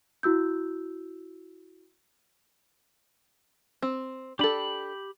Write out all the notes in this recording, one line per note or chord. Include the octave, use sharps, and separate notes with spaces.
E4 F#4 E6 G6
C4
D4 G4 A4 B5